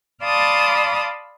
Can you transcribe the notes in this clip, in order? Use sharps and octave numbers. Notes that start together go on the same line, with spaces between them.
D5 F5 A5 B5 C6 D#6